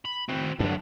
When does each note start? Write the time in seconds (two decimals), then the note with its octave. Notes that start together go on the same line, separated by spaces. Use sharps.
0.05 B5
0.29 C4 F#4
0.60 G2 D3 F#3 D4